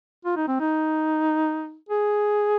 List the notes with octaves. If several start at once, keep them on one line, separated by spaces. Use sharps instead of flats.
F4
D#4
C4
D#4
G#4